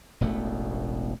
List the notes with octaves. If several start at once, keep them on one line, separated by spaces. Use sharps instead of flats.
E1 A1 B2 A3